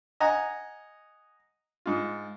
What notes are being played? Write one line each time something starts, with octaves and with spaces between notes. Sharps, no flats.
D#5 F#5 G#5 A#5
G#2 F4